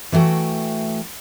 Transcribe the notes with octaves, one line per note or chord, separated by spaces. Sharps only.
E3 A3 F#4 G5